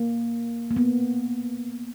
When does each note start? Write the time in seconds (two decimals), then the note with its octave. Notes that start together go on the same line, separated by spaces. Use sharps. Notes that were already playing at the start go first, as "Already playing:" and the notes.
Already playing: A#3
0.71 A#3
0.76 B3